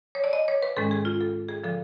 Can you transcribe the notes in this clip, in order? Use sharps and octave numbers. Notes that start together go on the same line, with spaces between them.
C#5
D5
D#5
C#5
B4
G#2 D#3 G#3 C#4 A4
G#4
F4
A4
G#4
D3 F3 A4